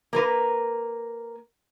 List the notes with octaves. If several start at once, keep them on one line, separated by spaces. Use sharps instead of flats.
A#3 A#4 B4